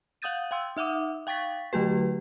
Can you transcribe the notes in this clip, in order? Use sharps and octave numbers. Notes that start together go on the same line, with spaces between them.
F5 F#5 D#6 G6 A6 D#7
F5 G5 C6 E6
D#4 E5 F#5 D6 D#6
F5 G5 C#6 A6 B6
D3 F#3 A3 F#4 G4 B4